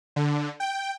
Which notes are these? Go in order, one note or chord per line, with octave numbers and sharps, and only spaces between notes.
D3
G5